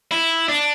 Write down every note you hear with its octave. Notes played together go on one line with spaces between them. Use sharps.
E4
D4